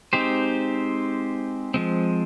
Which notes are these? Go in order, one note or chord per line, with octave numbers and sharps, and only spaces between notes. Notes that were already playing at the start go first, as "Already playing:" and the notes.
G#3 C4 D#4 G4 C5
F3 G#3 C4